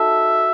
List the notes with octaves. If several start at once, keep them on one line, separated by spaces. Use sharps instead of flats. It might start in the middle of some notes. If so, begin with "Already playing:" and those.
Already playing: D#4 F#4 A4 E5